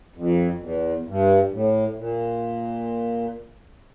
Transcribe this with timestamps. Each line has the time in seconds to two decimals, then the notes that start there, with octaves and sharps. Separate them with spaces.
0.16 F2
0.61 E2
1.07 G2
1.52 A2
1.98 A#2